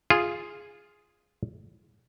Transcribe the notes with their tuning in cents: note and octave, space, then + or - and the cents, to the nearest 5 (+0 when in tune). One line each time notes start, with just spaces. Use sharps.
F4 +0 G#4 +0